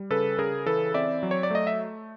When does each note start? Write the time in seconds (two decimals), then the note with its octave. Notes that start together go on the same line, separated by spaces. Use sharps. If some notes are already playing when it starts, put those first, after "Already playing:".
Already playing: G3
0.10 C#3 A4 B4
0.38 C#3 G#4 A#4
0.66 E3 A4 B4
0.94 C4 D5 E5
1.23 F#3
1.31 C#5
1.43 D5
1.51 A3 D#5
1.67 E5